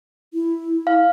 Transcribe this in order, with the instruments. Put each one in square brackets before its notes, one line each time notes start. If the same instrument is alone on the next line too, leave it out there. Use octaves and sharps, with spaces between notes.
[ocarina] E4
[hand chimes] F5